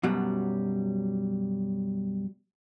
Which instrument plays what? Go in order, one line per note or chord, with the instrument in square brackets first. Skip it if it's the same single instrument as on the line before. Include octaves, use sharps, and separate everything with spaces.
[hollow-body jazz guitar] F#2 B2 F#3 G3